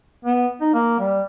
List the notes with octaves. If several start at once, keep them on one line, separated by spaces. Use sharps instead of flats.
B3
D#4
A#3
G3